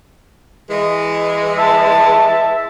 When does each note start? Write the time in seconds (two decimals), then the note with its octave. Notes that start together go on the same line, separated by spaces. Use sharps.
0.70 E3 G#3
1.58 E5 A5